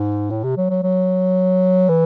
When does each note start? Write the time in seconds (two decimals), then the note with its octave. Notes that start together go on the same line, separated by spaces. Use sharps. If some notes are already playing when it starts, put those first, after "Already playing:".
Already playing: G#2
0.31 A2
0.43 C3
0.57 F#3
0.70 F#3
0.83 F#3
1.89 E3